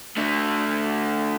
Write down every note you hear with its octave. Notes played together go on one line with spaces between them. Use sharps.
D3 A3